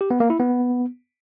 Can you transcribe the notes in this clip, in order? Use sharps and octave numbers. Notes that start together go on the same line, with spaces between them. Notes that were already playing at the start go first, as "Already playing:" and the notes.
G4
B3
A#3
E4
B3